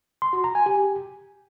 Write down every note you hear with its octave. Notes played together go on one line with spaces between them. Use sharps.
C6
F#4
A#5
G#5
G4